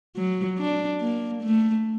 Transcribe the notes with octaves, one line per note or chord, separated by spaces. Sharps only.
F#3
D4
A#3
A3